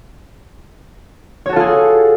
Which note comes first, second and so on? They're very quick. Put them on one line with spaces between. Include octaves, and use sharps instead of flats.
C#5 F#4 A4 F4 G#4